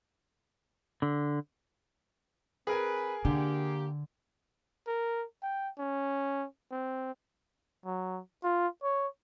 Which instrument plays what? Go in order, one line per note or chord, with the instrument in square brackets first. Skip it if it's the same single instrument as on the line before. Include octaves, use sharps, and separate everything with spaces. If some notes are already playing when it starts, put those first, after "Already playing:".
[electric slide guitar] D3
[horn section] C4 B4 [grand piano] G#4 A#4 G#5
[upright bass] D3 [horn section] A#3 G4
[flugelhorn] A#4
G5
C#4
C4
F#3
F4
C#5